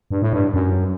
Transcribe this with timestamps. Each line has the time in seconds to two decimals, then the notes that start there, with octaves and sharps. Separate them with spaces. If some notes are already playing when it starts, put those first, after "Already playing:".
0.11 G2
0.22 A2
0.33 G2
0.54 F#2